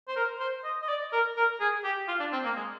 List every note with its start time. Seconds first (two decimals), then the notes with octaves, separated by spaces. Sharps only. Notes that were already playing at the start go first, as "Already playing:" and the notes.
0.08 C5
0.16 A#4
0.40 C5
0.64 D#5
0.82 D#5
0.88 D5
1.13 A#4
1.36 A#4
1.60 G#4
1.84 G4
2.08 F4
2.20 D4
2.32 C4
2.44 A#3
2.56 G#3